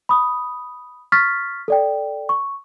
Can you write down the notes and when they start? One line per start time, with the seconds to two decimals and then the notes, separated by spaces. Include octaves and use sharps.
0.09 B5 D#6
1.12 C#6 F6 A6 B6
1.68 A4 D5 G5
2.29 C#6